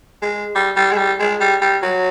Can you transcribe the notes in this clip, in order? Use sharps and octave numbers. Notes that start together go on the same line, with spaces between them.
G#3
G3
G3
G#3
G3
G#3
G3
G3
F#3